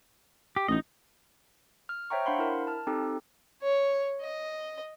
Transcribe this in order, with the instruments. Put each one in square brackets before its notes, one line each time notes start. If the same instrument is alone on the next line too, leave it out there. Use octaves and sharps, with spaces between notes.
[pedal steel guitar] G4
[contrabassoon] A1 [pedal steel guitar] D#4 D#5
[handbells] F6
C5 C#5 E5 G5 A#5 C#6
D4 C5 F5 F#5 B5 C6
E4 A#4
A5 F6
C4 D#4 G4 A4
[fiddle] C#5
D#5